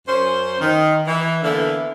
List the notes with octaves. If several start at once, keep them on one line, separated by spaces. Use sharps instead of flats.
F#2 C#4 C5
D#3
E3
D3 E3 A#3 B3 E4